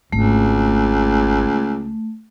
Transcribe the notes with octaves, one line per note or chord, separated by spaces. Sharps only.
G#1 C#2 A3